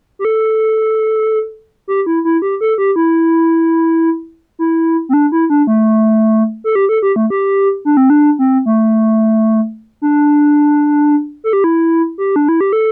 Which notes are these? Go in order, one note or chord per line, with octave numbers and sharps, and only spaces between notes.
G4
A4
G4
E4
E4
G4
A4
G4
E4
E4
C4
D4
E4
D4
A3
A4
G4
A4
G4
A3
G4
D4
C4
D4
C4
A3
D4
A4
G4
E4
G4
D4
E4
G4
A4